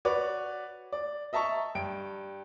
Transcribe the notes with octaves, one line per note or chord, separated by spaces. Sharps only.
F#4 B4 C#5 D5
D5
D#5 E5 A5 A#5 C#6
G2 G5 D7